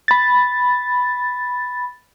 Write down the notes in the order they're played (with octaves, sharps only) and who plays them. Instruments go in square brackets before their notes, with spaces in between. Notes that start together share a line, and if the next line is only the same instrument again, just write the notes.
[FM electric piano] B5 A6